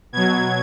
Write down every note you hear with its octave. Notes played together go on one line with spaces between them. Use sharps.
B2 F#3 G#6